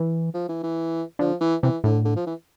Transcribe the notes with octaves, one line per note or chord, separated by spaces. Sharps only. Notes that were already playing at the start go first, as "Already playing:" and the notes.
Already playing: E3
F3
E3
E3
D3 F3
E3
C3 E3
A2 D3
D3
F3
E3